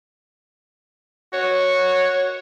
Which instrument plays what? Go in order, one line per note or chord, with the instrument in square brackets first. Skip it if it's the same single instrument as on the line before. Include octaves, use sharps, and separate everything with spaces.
[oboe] F#4 [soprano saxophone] C#5